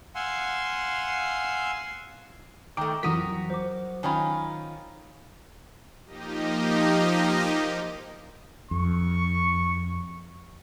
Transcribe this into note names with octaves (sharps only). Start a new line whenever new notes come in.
F5 F#5 G#5 C6 E6
D#3 A3 G5 A#5 D6
F2 E3 F#3 F#4 A#4 D#6 B6
F#3 C5 D6
D#3 C#4 F4 G#5 A#5 B5
F3 A#3 D#4 G4 D#5
F2 C#6